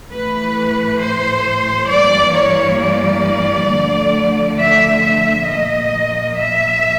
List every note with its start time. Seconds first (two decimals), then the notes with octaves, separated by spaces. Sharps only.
0.10 A2 E3 A3 B4
1.00 C5
1.89 G2 E3 G3 A#3 D5
2.34 C#5
2.79 D5
3.69 D2 D3 F3 A3
4.58 E5
5.02 E5
5.48 A#2 F3 A#3 D#5
6.38 E5